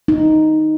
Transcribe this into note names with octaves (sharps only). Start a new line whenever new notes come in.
D#4